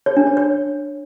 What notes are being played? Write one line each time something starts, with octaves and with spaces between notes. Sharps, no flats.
C#5
D4
C#5
C#5